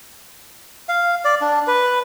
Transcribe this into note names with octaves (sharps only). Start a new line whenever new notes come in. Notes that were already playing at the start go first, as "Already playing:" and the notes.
F5
D5
D4
B4